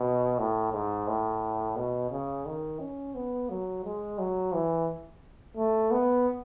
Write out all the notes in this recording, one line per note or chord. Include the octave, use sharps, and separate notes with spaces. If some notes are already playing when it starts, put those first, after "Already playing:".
Already playing: B2
A2
G#2
A2
B2
C#3
D#3
C#4
B3
F#3
G#3
F#3
E3
A3
B3